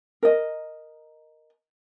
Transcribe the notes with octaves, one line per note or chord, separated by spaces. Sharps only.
A#4 D#5